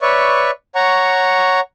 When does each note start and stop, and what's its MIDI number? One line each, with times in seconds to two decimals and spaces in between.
0.02 0.51 71
0.02 0.51 73
0.02 0.51 74
0.02 0.51 76
0.02 0.51 85
0.75 1.60 73
0.75 1.60 78
0.75 1.60 82
0.75 1.60 85